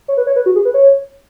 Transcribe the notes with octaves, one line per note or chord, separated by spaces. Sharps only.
C#5
B4
C#5
B4
F#4
G#4
B4
C#5